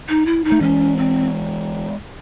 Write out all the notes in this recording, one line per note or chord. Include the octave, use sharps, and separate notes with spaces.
D#4
E4
D#4
A3
E3 G#3 C#4
C4